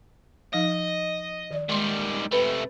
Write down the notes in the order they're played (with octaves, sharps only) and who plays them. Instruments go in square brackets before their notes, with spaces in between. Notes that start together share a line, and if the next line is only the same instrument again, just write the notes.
[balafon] F3 D#4 F5 [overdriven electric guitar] D#5
[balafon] D#3 D5
[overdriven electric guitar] D#3 G3 [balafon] G#3 C6
[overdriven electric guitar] C3 A3 [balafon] B4 B5